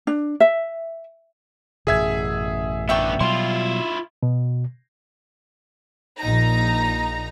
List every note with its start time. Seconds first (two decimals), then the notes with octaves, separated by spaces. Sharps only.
0.07 D4
0.40 E5
1.87 A1 F#2 B2 G#4 E5 G#6
2.89 B3 D4 E5 G5 C#6
3.21 B2 F#3 G3 E4 F4 C6
4.23 B2
6.19 A#1 D#4 A#5